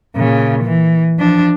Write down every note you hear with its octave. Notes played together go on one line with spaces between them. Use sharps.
A#2 C#3
E3
F3 D4